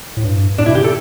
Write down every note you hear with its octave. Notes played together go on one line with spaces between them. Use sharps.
A2
G2
A2 D4
B2 E4
C#3 G4
A4